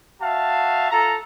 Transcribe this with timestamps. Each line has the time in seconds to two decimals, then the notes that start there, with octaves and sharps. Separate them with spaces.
0.22 F#4 E5 F5 A5
0.90 F4 A4 A#5